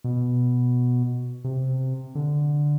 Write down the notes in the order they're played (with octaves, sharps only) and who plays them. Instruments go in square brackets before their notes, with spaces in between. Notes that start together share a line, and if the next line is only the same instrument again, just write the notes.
[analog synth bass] B2
C3
D3